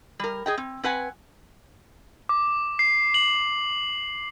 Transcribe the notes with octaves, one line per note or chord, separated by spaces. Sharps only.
G3 A#4
G#4 D#5 G5
C4
C4 B4 F#5 G#5
D6
C7
F#7